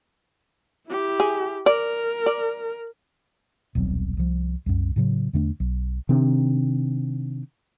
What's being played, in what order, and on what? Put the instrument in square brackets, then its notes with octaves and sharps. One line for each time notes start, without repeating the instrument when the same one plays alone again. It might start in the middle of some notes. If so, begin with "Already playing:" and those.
[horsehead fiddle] E4 G4
[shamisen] G#4
[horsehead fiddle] A#4 [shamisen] D5
[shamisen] D5
[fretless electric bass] D#1 B1 F#3 C4
C2 F3
C2 F#2
A2 C#3 F#3
E2 D3 A3 D4
B1
C3 D#3 C4 D4